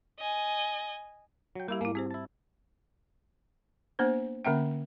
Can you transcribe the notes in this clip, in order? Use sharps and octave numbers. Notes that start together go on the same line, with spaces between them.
D#5 G#5
F#3 G5
G3 A#3 E4 G4
G#2 A#3 E4
C4 G4 G#4 C5
E4 A5
A#3 B3 D4 C5
D3 A#3 C#4 E5 G5